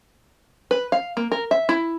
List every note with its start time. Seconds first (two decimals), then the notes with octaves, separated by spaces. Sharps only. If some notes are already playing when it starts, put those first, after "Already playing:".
0.71 B4
0.92 F5
1.17 A#3
1.32 A#4
1.51 E5
1.69 E4